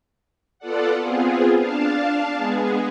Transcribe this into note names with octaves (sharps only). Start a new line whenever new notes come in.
B3 F4 A4 D5 F#5
B3 C4 F4 G#4
D4 F5 A5
G#3 B3 G#4